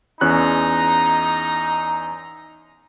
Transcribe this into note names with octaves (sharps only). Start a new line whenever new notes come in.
E2 C#4 D#4 A#5 F#6